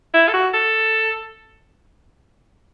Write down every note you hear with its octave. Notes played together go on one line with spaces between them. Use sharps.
E4
A4
F#4
A4